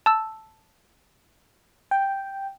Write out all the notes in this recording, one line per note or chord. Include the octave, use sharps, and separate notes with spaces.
A5 E6
G5